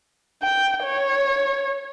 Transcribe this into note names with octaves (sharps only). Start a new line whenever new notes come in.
G5
C#5